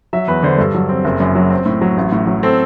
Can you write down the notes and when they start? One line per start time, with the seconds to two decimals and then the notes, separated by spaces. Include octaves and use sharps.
0.13 F#3 E5
0.27 E2 B4
0.43 D3 C5
0.58 G2 A4
0.74 F#3
0.89 C4
1.04 F#1
1.20 F#2
1.35 F#3
1.50 C4
1.66 A2
1.81 F#3
1.97 A1
2.12 A2
2.27 F#3
2.43 C4 A4